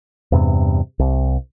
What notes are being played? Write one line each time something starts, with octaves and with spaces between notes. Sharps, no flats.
E2 G2 C3
C2